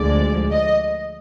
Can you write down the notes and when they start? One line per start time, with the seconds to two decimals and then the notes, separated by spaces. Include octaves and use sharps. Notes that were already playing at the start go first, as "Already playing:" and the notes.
Already playing: D2 D3 F3 G#3 D5
0.51 D#5